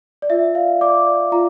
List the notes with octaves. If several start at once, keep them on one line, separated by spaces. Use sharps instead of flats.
D5
F4 E5
D5 F5
D5 D6
D5
F4 A#5